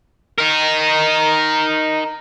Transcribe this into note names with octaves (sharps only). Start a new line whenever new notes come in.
D#4 A#4